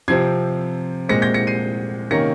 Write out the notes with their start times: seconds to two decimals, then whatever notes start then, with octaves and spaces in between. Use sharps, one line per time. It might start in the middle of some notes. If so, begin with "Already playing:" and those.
0.08 C3 F3 C4 G#6 C7
1.09 A#2 G#3 C4 A#6 C#7
1.22 G6 A#6
1.34 A#6 C#7
1.47 C7 D#7
2.10 C3 D#3 A#3 C#4 A#6 C#7